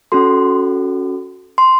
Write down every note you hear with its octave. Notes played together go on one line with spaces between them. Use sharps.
C#4 F#4 A4 C6
C6